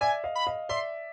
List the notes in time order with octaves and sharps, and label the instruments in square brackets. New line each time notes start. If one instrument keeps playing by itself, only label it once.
[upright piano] D5 E5 [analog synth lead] G#5
[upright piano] D#5 F5
[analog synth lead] B5
[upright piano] D#5 F5
[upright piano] D5 E5 [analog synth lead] C6